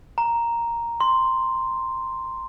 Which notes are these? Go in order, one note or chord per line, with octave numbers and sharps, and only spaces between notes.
A#5
C6